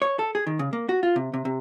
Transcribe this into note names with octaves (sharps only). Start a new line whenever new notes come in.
C#5
A4
G#4
D#3
C#3
A#3
F#4
F4
C3
C3
C3